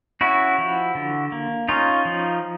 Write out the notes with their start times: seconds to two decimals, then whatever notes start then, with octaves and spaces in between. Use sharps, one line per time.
0.21 C#4 E4 F#4
0.58 F3
0.95 D3
1.32 A#3
1.69 C#4 D#4 F4
2.05 F3